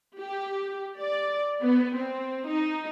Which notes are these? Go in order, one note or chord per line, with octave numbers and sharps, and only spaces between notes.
G4
D5
B3
C4
D#4